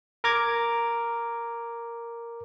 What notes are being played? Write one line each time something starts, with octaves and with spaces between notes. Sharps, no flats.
A#4 A#5 D6 G#6